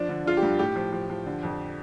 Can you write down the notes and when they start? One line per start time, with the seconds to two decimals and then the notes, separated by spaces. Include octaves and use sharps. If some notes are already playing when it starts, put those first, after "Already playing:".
Already playing: F3 D4
0.09 D3
0.26 D3 F4
0.37 G4
0.43 G2
0.59 A2 G4
0.76 F3
0.92 F3
1.10 F3
1.26 D3
1.43 F2